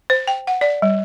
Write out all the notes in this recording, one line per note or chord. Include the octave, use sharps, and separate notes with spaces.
C5
G5
F#5
D5
G3